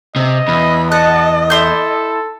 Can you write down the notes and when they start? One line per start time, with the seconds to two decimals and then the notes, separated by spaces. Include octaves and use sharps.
0.16 C3 D#5
0.48 E2 B5
0.92 D#5 F#5 A5
1.50 E4 A4 C6 G6